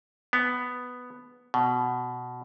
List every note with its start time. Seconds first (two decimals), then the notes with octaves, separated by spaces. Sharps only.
0.33 B3
1.54 B2